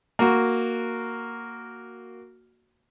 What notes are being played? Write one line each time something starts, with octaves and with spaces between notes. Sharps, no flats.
A#3 F#4